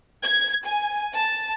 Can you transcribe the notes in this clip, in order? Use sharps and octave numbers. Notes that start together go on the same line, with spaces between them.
G#6
G#5
A5